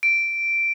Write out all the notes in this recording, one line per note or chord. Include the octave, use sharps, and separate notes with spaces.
D7